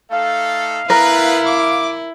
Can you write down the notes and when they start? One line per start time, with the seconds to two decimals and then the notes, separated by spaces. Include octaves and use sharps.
0.12 A3 D#4 A4 F5
0.90 B3 E4 A#4 B4
1.47 D6